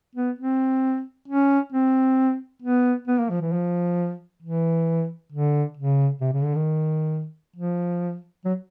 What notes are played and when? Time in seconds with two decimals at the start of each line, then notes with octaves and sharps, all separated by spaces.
0.15 B3
0.39 C4
1.28 C#4
1.72 C4
2.62 B3
3.08 B3
3.18 A#3
3.30 F3
3.41 E3
3.52 F3
4.42 E3
5.32 D3
5.77 C#3
6.21 C3
6.33 C#3
6.44 D3
6.55 D#3
7.56 F3
8.45 F#3